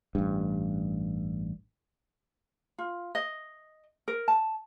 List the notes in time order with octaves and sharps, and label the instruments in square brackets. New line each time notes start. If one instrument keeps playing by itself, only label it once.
[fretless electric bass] A1 G2
[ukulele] F4
D#5
A#4
A5